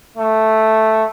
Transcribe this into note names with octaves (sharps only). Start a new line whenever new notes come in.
A3